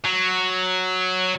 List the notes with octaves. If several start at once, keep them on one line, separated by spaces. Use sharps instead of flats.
F#3